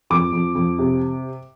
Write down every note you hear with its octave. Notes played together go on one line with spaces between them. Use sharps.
F2 D6
F2
F2
C3